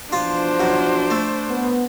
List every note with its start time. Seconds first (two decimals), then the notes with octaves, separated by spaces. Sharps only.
0.12 B2 E3 F3 D4 F4 C5
0.60 F#2
1.10 A3
1.49 B3